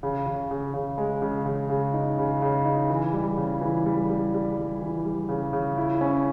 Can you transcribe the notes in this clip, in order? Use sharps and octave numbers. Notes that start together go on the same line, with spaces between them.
C#3
C#3
C#3
C#3
G#3
C#3
C#3
C#3
D#4
C#3
C#3
D#4
E3
G3
C#3
E3
G3
G3
G3
G3
E3
G3
C#3
C#3
E4
C#4